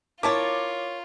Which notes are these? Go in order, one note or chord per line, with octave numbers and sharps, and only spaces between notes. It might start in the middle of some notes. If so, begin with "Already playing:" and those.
E4 F4 A#4 C#5 A5 D6